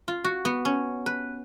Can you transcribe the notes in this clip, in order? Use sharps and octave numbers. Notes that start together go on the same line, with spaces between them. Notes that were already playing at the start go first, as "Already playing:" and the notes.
F4
F#4
B3
C#4
B4